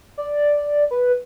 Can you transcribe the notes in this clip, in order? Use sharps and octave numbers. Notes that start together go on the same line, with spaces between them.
D5
B4